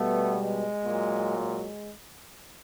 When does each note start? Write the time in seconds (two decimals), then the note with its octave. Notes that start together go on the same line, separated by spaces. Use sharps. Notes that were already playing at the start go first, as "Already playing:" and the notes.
Already playing: B2 G3 A3 B3
0.35 G#3
0.86 A#2 F#3
1.37 G#3